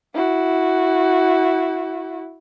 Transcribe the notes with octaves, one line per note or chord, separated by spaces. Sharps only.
E4 F#4